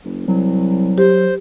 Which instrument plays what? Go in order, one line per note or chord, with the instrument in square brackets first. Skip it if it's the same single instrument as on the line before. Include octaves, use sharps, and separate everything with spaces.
[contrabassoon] F#1
[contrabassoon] C2 [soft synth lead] F#3
[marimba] G4 [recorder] C5